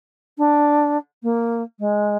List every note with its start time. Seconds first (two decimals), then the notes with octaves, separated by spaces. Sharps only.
0.38 D4
1.23 A#3
1.79 G#3